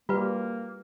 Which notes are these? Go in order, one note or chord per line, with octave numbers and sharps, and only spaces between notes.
G3 A#3 F4 F#4 B4